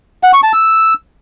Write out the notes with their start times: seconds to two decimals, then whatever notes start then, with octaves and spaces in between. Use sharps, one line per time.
0.23 F#5
0.33 C#6
0.43 A5
0.53 E6